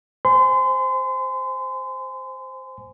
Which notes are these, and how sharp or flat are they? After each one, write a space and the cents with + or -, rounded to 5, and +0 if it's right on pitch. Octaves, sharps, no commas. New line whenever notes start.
C5 +0 G#5 +0 C6 -35